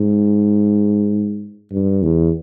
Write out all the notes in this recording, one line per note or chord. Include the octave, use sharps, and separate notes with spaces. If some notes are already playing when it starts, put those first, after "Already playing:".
Already playing: G#2
G2
E2